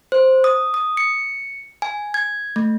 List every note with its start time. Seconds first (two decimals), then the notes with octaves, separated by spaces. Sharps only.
0.12 C5
0.44 D#6
0.74 D#6
0.97 C#7
1.82 G#5
2.14 G#6
2.56 A3